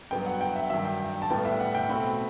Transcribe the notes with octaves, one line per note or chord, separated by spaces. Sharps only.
G2 F#3 B3 G5
F#5
G5
E5
G2 D#3 F#3 E5
G5
G5
A5
A2 G3 B3 G5
E5
F#5
G5
B2 A3 C4 B5